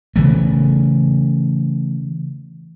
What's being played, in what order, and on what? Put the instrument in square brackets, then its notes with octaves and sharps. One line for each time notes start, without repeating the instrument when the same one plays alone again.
[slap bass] C#3 E3 A3